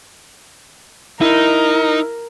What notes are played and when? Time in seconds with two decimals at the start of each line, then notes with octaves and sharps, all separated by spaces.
1.21 D#4 E4 A#4